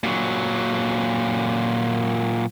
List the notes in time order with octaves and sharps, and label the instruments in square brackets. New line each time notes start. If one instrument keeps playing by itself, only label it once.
[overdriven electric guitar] A#2 F#3